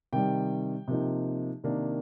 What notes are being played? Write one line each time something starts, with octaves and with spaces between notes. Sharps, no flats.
C3 D#3 G3 G5
C3 F3 A#3 D#4
C3 D#3 A#3 D4